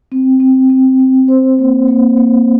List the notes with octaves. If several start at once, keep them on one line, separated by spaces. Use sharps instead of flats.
C4
C4
C4
C4
C5
A#3
A#3
A#3